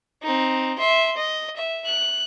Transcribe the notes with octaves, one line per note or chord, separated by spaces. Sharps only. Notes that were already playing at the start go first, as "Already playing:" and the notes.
C4 D#4
E5 C6
D#5
E5
F#6